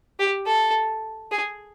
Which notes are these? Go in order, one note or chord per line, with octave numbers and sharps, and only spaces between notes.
G4
A4
G#4